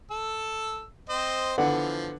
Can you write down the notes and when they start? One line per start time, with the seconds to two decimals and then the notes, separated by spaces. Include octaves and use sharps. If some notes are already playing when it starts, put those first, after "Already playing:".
0.11 A4 E6
1.09 C4 C5 D#5
1.58 D3 E3 F3 B3 F#5